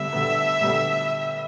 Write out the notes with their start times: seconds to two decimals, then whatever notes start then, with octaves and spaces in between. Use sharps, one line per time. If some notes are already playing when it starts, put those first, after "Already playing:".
Already playing: D3 G3 B3 E5
0.13 D3 G3 B3
0.62 D3 G3 B3